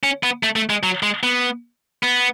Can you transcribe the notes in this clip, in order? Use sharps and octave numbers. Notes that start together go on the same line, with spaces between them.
C#4
B3
A3
A3
G#3
F#3
G#3
B3
B3